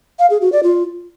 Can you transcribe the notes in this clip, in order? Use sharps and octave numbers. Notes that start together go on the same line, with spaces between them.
F5
G#4
F#4
D5
F4